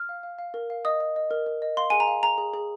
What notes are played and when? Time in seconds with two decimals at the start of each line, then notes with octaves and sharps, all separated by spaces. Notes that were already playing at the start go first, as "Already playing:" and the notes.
Already playing: F6
0.09 F5
0.23 F5
0.39 F5
0.54 A#4
0.70 F5
0.85 D#5 D#6
1.00 D#5
1.16 D#5
1.31 A#4
1.46 A#4
1.62 D#5
1.77 F5 C6
1.90 G#4 G#5
2.00 A#5
2.07 F5
2.23 G#4 A#5
2.38 G#4
2.54 G#4